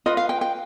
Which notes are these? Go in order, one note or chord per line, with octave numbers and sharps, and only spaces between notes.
F4 B4 D#5
F5
G5
G5